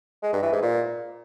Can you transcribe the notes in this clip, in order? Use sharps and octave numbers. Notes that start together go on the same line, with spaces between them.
G#3
G2
E3
G#2
A#2